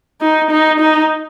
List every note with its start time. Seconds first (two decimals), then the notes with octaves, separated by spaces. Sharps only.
0.21 D#4
0.51 D#4
0.80 D#4